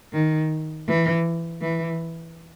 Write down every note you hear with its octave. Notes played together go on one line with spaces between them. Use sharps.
D#3
E3
E3